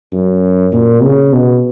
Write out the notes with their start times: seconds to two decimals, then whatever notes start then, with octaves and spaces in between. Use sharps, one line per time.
0.13 F#2
0.73 A#2
1.03 C#3
1.33 B2